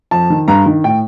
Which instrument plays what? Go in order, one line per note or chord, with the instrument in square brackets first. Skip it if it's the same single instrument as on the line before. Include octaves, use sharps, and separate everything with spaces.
[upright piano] F2 A5
D#3
G2 A#5
D#3
A2 G5